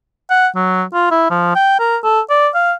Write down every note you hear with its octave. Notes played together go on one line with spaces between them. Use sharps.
F#5
F#3
F4
E4
F3
G5
A#4
A4
D5
F5